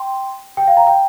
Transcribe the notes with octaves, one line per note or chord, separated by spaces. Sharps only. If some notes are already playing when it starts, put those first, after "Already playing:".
Already playing: G5 C6
G5
F5
A#5
G5